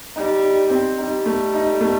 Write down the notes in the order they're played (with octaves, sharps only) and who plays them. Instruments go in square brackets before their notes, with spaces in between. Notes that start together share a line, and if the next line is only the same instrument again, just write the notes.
[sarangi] G3 [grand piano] D#4
[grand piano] D#4
C4
[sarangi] G3 [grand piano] D#4
[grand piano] A3
D#4
A3